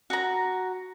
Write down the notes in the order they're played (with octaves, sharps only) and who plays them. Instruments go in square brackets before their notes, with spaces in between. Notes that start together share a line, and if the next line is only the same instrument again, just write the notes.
[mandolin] F#4 A#5